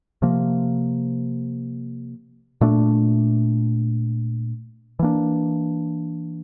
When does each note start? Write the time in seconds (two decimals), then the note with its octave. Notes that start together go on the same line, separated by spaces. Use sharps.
0.22 C3 F3 A#3
2.61 A#2 A3 D4
4.99 E3 A#3 D4